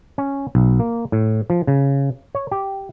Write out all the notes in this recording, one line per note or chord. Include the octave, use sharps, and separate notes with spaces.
C#4
B1
A#3
A2
F3
C#3
C#5
G4